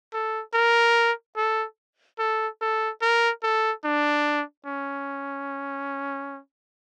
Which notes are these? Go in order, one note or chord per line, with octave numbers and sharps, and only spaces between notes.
A4
A#4
A4
A4
A4
A#4
A4
D4
C#4